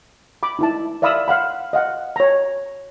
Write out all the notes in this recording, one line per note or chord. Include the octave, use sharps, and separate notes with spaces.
B5 D6
D#4 E4 A5
D5 E5 F5 B5 D#6 E6
F5 F#5 B5
D#5 F5 F#5
C#5 A#5